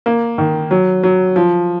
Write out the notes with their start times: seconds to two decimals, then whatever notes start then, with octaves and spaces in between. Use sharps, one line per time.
0.06 A#3
0.38 D#3
0.71 F#3
1.03 F#3
1.36 F3